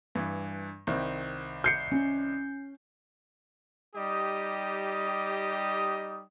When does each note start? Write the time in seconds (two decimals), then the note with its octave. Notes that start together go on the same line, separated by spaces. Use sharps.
0.15 G2 E3
0.87 C2 D#3 C4
1.64 G6 C7 C#7
1.92 C#4
3.95 G3 D#4 G4 D#5 D#6